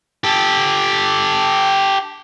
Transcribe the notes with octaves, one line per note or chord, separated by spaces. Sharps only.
G4 A4